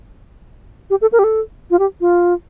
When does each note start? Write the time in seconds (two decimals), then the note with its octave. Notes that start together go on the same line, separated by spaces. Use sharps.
0.90 G4
1.01 A4
1.12 A#4
1.19 G4
1.24 A4
1.71 F4
1.79 G4
2.01 F4